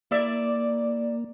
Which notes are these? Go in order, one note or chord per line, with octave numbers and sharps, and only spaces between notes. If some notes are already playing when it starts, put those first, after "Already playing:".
A#3 E4 D5 E5